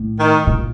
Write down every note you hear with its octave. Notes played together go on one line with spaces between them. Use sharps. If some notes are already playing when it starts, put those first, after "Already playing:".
Already playing: A2
D#3
A#2